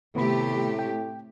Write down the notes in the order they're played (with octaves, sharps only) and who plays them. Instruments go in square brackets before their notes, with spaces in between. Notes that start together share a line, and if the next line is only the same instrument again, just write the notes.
[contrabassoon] A2 [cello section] C3 A3 G4 [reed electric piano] D#3 B3 B5
[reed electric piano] G5